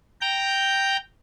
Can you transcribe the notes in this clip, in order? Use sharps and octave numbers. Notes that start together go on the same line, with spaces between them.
G5 A#5 G6